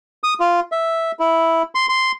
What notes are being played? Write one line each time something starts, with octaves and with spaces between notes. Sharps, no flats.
D#6
F4
E5
E4
C6
C6